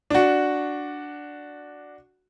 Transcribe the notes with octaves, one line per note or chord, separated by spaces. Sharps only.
D4 F#4